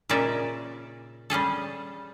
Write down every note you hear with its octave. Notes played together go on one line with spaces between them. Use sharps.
A#2 C#3 C#4 D#4 D5 E5
G3 C#4 G#4 A4